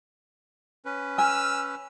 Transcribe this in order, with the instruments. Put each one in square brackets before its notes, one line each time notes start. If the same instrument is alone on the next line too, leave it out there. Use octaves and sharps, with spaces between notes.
[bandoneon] C#4 B4
[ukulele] G#5 [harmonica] E6 F6